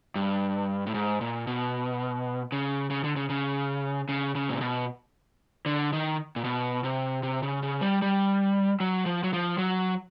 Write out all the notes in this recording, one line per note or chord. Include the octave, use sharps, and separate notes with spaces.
G2
A2
G#2
A#2
B2
C#3
C#3
D3
C#3
C#3
C#3
C#3
A#2
B2
D3
D#3
A#2
B2
C3
C3
C#3
C#3
G3
G3
F#3
F3
F#3
F3
F#3